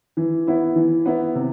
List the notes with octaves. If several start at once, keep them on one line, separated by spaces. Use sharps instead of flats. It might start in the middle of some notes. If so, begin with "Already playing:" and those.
E3
B3 E4
E3
B3 E4
C3